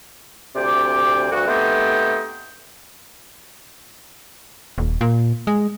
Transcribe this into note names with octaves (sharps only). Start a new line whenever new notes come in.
D2 C3 D5 G5 D6
D2 G2 F#4
A3 B3 C4 D#4 G4
D#1
A#2
G#3